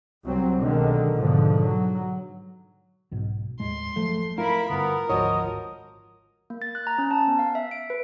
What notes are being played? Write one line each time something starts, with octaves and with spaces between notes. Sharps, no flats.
C2 F#3 C4
B1 D3 D#3 G#3
G#2 B2 D3 F3
F#3
B1 G#2 B2
D#2 A2 G#3 C6
F#1 F3 F#3 A3
E4 F4 A#4 B5
G2 D3 B3 A#4
G#1 D2 F3 F#4 C#5 D#5
A#3
A6
F#6
A#5
C#4
A5
B3
F5
E5
D7
B4